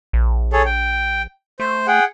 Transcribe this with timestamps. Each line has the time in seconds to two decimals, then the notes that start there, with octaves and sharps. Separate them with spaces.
0.13 A#1
0.53 G#4 A4 C#5
0.66 G5
1.60 A3 C5
1.87 G#4 F#5 G5